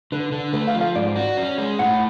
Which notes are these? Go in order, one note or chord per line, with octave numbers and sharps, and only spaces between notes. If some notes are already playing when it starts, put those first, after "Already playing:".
D3 B4
D3
A3 B4
F5
F3
F5
G#2 D5
F#4
C#4
G#3
A2 F#5